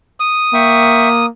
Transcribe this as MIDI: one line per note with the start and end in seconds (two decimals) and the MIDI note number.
0.20 1.26 87
0.54 1.29 58
0.54 1.08 76
0.54 1.08 79
0.54 1.08 85